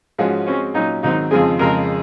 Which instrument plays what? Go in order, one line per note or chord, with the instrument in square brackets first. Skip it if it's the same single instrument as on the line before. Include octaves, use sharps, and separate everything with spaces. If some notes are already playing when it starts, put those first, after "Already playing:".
[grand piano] G#2 F3 G#3 C#4 F#4
[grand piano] G#3 C4 F#4 [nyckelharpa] C#4
[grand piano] A#2 F#3 C#4 [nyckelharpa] D#4
[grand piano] G#2 D#3 F#3 C4 [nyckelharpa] D#4
[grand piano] F2 C#3 F3 G#3 C4 [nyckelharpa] G#4
[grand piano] F2 C#3 G#3 [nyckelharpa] A#4